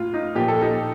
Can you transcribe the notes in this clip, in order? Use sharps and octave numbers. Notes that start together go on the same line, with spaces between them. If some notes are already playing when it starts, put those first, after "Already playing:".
Already playing: A2 A#3 F4
D#4
A#2 F3 A#3 G4
A4
D#4 G4